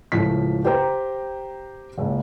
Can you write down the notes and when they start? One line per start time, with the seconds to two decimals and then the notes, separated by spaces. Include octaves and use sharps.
0.12 C#2 A2 F3 B6
0.65 G4 C5 G5 A#5
1.98 F#1 C#2